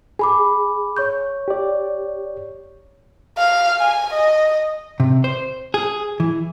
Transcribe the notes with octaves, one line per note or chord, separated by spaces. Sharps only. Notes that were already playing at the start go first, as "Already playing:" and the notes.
G#4 G#5 B5 D6
C#5 C#6 G6
G4 D5
F5
G#5
D#5
C3
C5
G#4
E3